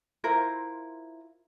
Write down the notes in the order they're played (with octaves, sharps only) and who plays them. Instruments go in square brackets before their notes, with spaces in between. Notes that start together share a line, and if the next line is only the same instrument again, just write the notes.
[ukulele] E4 F4 A#4 C5